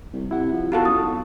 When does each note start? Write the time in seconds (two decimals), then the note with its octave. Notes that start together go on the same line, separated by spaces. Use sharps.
0.13 C2
0.31 C3 E4 F#5
0.52 F3
0.72 B2 F4 F#4 A4
0.85 F#2 D#6
1.00 B1